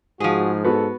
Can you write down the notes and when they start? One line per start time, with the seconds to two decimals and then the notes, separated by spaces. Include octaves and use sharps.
0.20 G#2 F3 F#4 G#4
0.64 B3 F#4 A4